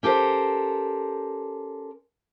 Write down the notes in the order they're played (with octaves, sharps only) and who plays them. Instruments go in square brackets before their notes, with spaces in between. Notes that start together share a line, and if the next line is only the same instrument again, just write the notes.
[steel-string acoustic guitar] C#4 G4 A4 A#4 C5